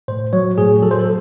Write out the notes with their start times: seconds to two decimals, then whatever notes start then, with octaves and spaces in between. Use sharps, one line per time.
0.08 A2 C5
0.33 F#3 C#5
0.58 A2 G#4
0.82 F#3 A4
0.91 C5
0.99 A4